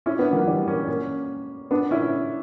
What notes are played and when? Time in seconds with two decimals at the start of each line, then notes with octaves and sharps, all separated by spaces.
0.06 C#4 E4
0.19 B3 D4
0.33 F#3 A#3
0.47 E3 G3
0.68 A#3 C#4
0.88 A#3 C#4
1.71 B3 D4
1.91 C#4 E4